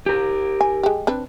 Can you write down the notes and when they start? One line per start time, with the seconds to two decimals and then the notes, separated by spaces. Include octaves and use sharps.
0.06 G4 A#4
0.61 G#5
0.83 G#3 G4
1.07 C4 D4 B4